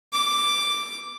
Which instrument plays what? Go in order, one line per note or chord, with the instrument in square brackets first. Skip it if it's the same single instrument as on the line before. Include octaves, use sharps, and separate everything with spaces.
[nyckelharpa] D6